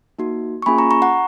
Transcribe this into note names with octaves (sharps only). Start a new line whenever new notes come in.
A#3 D#4 F#4
C#6
A#3 C#4 F4 G#4 G#5 B5
A#5 C#6
A#5 C#6
F#5 A#5